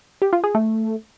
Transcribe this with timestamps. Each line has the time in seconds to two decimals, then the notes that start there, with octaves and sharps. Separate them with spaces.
0.22 G4
0.33 F4
0.44 G#4
0.55 A3